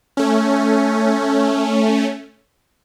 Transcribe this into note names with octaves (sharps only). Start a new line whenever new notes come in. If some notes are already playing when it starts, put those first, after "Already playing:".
A3 C#4